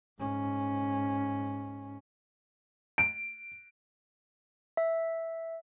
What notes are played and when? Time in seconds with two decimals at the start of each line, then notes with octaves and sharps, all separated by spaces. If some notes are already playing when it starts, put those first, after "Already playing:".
0.20 G#2 C#4
2.98 D7
4.77 E5